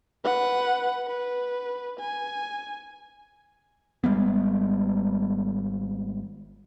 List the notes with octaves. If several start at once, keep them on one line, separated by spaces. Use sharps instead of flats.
B4 F#5
B4
G#5
G#1 G3 G#3 B3